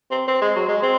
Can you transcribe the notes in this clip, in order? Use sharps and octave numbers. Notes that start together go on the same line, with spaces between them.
C4
C4
G#3
F#3
G#3
C4